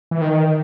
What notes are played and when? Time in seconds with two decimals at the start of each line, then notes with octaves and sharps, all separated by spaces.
0.11 E3
0.21 D#3